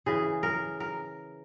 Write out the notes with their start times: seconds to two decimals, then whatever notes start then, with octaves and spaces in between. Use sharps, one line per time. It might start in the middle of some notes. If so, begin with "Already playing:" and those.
0.06 C#3 E3 G#4
0.43 A#4
0.80 A#4